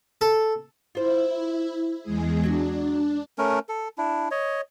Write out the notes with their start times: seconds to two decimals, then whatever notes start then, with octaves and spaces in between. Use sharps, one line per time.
0.21 A4
0.95 E4 F4 C5
2.02 E2 G#3 G#4
2.43 F#3 D4 F#4
3.38 A3 C#4 A#4
3.69 A4
3.98 D4 E4
4.31 C#5 D#5